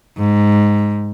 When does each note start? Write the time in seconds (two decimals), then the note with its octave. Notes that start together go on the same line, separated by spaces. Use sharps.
0.18 G#2